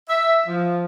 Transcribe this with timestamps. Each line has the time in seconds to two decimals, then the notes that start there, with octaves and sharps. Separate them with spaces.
0.08 E5
0.48 F3